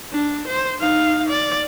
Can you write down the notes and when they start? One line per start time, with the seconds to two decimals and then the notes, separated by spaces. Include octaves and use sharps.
0.12 D4
0.48 C5
0.80 D#4 F5
1.29 D5